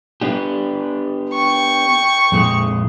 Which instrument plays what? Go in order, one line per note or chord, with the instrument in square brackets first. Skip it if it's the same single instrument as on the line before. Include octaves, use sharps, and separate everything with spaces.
[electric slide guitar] B3 D4 G4
[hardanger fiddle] G5 C#6
[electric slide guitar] F2 A#2 G#3